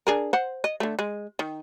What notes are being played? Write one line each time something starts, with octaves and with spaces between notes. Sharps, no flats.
D4 G#4 A#4
C5 F#5
D#5
D3 A3
G#3
D#3